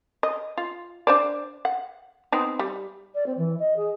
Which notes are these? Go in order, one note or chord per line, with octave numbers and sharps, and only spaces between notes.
D#5
F4
D4 C5 D5
F#5
B3 C4 D#4
G3
D5
C4
E3
D#5
G#4